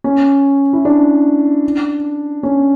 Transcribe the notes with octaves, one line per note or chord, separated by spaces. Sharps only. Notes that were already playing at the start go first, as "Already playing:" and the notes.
C#4
E4
D4
C#4